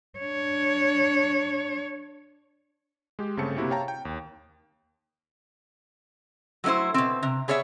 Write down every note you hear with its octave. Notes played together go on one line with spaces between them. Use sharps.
D4 C#5
G#3 G4
G1 C#3 A3 C4 A5 C#7
C3 A#3 C4 E4 F#4 G4
C#5 F5 G5 A5 A#5
G5
D#2
F#3 A3 D4 E4 C5
B2 C4
C3
B3 G#4 C#5 D5 E5